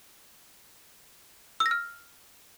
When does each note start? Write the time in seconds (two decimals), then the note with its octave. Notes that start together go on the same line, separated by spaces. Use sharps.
1.60 E6
1.66 A#6
1.71 F6